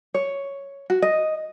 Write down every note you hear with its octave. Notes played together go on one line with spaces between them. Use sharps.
C#5
F#4
D#5